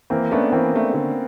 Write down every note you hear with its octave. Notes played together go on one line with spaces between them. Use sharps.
E3 A#3 C4
A3 B3 C#4 D4
E3 A#3 C4
A3 D4
D3